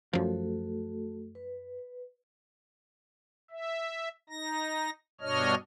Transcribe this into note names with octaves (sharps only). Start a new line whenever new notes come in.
F#2 F3 A3 F#4 A4
B4
E5
D#4 A#6
G2 B2 D4 C#5 D#5 F6